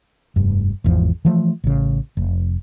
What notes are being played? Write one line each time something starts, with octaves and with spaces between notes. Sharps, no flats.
F1 G2
G#1 E2 F3
E3 F3 A3
A1 C#3
F1